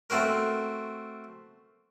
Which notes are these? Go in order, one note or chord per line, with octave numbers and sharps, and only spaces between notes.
A3 C4 F#4 A#4